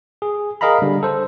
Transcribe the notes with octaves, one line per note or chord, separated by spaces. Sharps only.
G#4
G#4 A#4 D#5 F5 A#5 B5
D3 G3
A4 C5